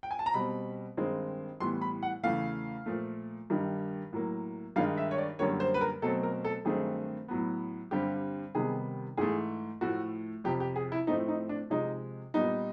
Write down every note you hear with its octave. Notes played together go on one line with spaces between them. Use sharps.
G5
G#5
A5
A#5
B2 G3 C4 B5
G2 D#3 G#3 C4
A2 E3 G3 B3 C6
B5
F#5
E2 C#3 E3 A3 F5
A#2 F3 A3
G2 D#3 G3
A2 F#3 A#3
G2 D#3 G#3 F5
E5
C#5
D5
F#2 D3 G3 A#3 C#5
C5
B4
A#4
B2 F#3 A3 C4 A4
A#4
A4
G2 D#3 F#3 A3 C4 G#4
A2 F#3 B3
G2 D3 G3 C4 G4
C3 D#3 G3 B3 G#4
G#2 E3 A3 G#4
A2 F3 A3 F#4
F2 C3 F3 G4
G4
G#4
E4
A2 F3 A3 C4 D#4
D#4
D4
C3 F3 G#3 D#4
A#2 G3 B3 D#4